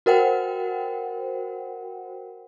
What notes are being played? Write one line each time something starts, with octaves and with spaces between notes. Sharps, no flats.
F#4 A#4 C5 F#5 G5